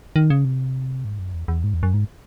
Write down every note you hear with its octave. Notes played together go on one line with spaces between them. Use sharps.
D#3
C#3
C3
G#2
F#2
E2
E2
G#2
E2
F#2
G#2